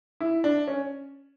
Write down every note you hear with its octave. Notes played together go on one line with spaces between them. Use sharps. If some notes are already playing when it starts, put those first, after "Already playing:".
E4
D4
C#4